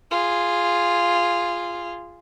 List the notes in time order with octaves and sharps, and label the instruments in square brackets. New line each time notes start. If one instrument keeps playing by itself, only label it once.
[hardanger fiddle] F4 G#4